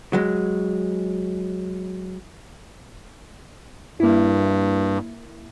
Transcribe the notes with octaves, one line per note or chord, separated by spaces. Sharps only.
F#3 G#3
G2 A#3 E4